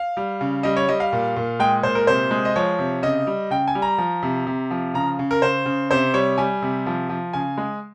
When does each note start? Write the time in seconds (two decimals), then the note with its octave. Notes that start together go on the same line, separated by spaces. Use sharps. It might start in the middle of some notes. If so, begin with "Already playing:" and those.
Already playing: F5
0.17 G3
0.41 C#3
0.63 G3 D#5
0.77 C#5
0.88 G3 D#5
1.00 F5
1.12 A#2
1.36 A#2
1.60 G#3 G5
1.83 A#2 C5
1.95 A#4
2.07 C3 C5
2.31 G#3
2.45 D#5
2.56 F3 C#5
2.79 C3
3.03 C#3 D#5
3.27 G3
3.50 C#3 G5
3.68 G#5
3.75 G3
3.82 A#5
3.98 F3
4.23 C3
4.47 C3
4.71 F3
4.94 C#3 A#5
5.19 C#3
5.31 A#4
5.42 C#3 C5
5.66 C#3
5.91 C3 C5
6.13 G3 C#5
6.38 G3 G#5
6.62 C3
6.86 F3
7.09 F3
7.33 C#3 G#5
7.58 G#3